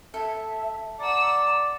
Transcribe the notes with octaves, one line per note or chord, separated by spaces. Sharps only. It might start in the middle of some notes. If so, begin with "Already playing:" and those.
A4 E5
D5 F#5 A#5 E6